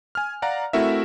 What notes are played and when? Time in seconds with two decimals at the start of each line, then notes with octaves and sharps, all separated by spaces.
0.15 G#5 F6
0.42 D5 F5 F#5 A#5
0.73 A3 C4 E4 F#4 A#4 E5